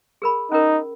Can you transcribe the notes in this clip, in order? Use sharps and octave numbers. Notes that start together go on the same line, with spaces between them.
G#4 A#4 B5
C#4 D#4 A#4